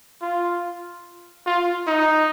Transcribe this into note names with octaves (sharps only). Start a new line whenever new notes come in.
F4
F4
D#4